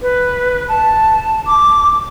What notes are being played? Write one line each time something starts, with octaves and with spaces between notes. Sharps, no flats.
B4
A5
D6